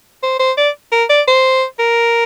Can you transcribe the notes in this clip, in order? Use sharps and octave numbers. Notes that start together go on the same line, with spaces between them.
C5
C5
D5
A#4
D5
C5
A#4